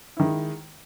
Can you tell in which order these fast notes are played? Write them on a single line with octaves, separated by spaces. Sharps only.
E4 D#3 G#3